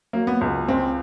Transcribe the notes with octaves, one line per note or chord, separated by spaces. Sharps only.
F#3 A#3
B3
C#2
C#2 C4